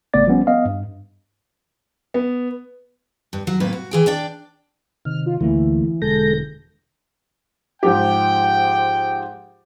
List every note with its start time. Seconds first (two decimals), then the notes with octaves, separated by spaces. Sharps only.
0.13 A1 C#3 A3 B3 D5 A6
0.27 F3 G3 B3 C#4
0.47 B3 D#5 F5
0.65 G2
2.14 B3
3.33 G2
3.47 F#3
3.60 A2 C3 A#3 B4
3.73 F#4
3.91 E3 G#4 G5
4.06 D4 D5 G5
5.05 C3 D#3 F6
5.26 F4
5.41 D2 D3 E3 A3 A#3
6.02 E1 D3 G#3 A4 G6 A#6
7.83 G#2 F3 G4 G5